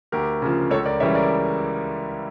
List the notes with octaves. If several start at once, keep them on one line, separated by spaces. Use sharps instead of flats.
D2 G4 A#4
C#3 F3
C#2 A4 C#5
A#4 D5
C#3 E3 G3 C#5 E5
A#4 D5